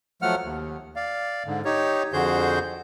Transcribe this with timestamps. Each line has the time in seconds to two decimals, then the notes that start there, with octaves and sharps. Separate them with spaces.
0.22 F3 F#3 A3 F#5 F6
0.43 D#2
0.96 D5 F5
1.46 G#2 D3
1.65 D#4 G4 C#5
2.13 F2 D3 F#4 G#4 C5 G6